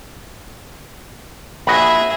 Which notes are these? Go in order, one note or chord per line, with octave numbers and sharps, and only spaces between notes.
A#1 F#4 G#4 D#5 E5 B5